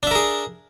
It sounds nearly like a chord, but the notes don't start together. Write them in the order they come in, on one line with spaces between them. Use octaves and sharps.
D4 E5 A#4 G#4